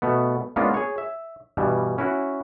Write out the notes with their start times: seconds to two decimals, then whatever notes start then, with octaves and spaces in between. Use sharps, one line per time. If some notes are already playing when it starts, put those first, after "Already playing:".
0.02 B2 A3 B3
0.56 G#3 A#3 B3 C#4 D4 F4
0.74 G#4 C#5
0.98 E5
1.57 G2 B2 E3 G3
1.98 C#4 E4 F#4